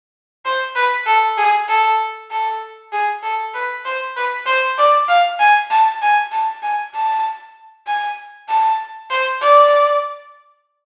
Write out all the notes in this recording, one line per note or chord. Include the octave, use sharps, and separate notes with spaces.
C5
B4
A4
G#4
A4
A4
G#4
A4
B4
C5
B4
C5
D5
F5
G#5
A5
G#5
A5
G#5
A5
G#5
A5
C5
D5